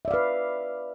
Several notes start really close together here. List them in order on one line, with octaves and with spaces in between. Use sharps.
E5 D5 F5 B4